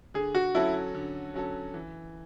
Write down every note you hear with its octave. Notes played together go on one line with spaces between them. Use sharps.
D3 G#4
F#4
F#3 C#4 E4 F#4 A4
D3
F#3 C#4 F#4 A4
E3